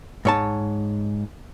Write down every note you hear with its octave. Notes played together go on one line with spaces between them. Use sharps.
G#2 C#5 A5